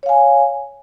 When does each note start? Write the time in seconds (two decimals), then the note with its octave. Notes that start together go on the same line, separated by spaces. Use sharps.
0.03 C#5
0.06 F5
0.09 G#5